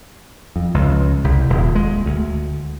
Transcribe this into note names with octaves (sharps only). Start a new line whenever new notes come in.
F2
C#2
C2
D#1
G#3
D2